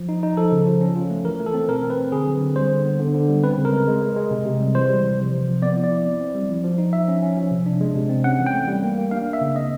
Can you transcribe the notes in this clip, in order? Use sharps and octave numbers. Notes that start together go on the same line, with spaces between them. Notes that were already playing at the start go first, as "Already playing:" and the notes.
Already playing: F3
D#4
D#4
F3 A4
C#3
F3
C#4
F4
A3
E3 A#4
A3
A4
C4
B2 A#4
C4
B4
C4
D3 G#4
F#3
D3
G3 C5
D3
B3
D3
D3
G3
C4 B4
C#3
A#4
G#3
G#3
G#3
G#3
C3
C3
G3
E3 C5
G3
C3
F3
C3
F3
B3 D5
E4
D5
E4
C4
C4
G3
F3
F3
D#4
F3 E5
C#4
C#4
F3
C3
D4
G#3
C3
C4
C#4 F#5
E3
G5
A3
G3
A#3
A#3
D4 F5
A#3
E5
C#3
C4 D#5